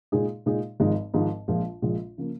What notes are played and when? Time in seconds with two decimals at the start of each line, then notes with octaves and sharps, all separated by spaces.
0.12 A#2 G#3 D#4 G#4
0.46 A#2 G#3 D#4 G#4
0.80 G#1 G#2 F3 G#3 D#4
1.14 G#1 G#2 F3 G#3 D#4
1.48 A#1 A#2 F3 G#3
1.82 A#1 A#2 F3 G#3
2.18 C#3 F3 A#3